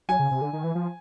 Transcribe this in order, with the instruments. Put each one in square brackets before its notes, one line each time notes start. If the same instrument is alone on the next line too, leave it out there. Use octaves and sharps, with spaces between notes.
[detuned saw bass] F#3 [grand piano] G#5
[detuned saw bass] C#3
C3
D3
D#3
E3
F3